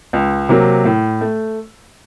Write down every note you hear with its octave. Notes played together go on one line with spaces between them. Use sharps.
C#2
C3 F#3 A#3
A2
A3